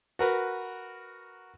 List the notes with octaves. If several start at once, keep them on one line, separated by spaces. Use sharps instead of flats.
F#4 A#4 B4